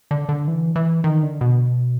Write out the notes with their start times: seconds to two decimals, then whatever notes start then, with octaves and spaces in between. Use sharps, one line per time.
0.11 D3
0.29 D3
0.48 E3
0.76 E3
1.04 D#3
1.23 D3
1.41 B2